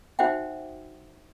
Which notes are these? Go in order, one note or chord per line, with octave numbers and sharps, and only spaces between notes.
D#4 F#4 C5 E5 F#5 G5